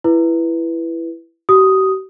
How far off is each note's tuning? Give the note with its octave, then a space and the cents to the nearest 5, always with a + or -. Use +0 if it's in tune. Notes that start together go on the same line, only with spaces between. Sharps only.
E4 +15 B4 -10
G4 -45 D#6 +0